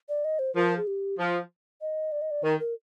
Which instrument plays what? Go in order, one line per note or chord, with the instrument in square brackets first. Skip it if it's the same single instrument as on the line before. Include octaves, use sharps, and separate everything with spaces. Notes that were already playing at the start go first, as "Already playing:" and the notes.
[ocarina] D5
D#5
C5
[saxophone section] F3 [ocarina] A#4
[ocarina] G#4
G4
[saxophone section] F3
[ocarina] D#5
D5
D#5
D5
[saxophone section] D#3 [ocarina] A#4
[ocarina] A#4